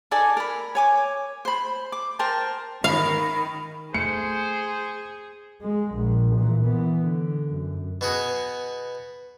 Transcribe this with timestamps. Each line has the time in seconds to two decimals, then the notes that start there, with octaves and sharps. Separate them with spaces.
0.11 D#4 A4 D5 G#5
0.37 A#4 B5
0.75 C#5 G#5 D6
1.45 C5 B5
1.92 D6
2.19 A#4 C5 G5 A5
2.84 D#3 F5 B5
3.94 A3 G#4 C5 C#7
5.62 G#3
5.95 A#1
6.36 A#2 E3
6.65 E3 B3
7.02 D3
7.50 F#2
8.01 B2 F#4 G#4